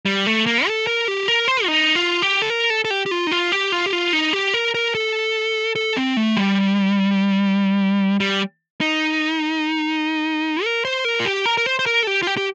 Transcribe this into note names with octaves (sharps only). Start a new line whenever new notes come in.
G3
A3
A#3
A4
A#4
G4
A#4
C5
F4
D#4
F4
G4
A4
A#4
A4
A4
G4
G4
F4
D#4
F4
G4
F4
G4
F4
D#4
G4
A#4
A#4
A4
A4
C4
A3
G3
G3
D#4
A#4
C5
A#4
F4
G4
A#4
A#4
C5
C5
A#4
A4
G4
F4
G4
G4